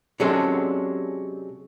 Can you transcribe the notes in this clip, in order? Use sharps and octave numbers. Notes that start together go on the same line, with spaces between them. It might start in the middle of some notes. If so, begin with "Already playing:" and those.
C3 F#3 G#3 C#4 D4 A4